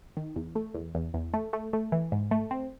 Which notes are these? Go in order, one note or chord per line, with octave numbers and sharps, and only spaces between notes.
D#3
E2
A3
E2
E2
E2
A3
A3
A3
E3
G#2
A3
C4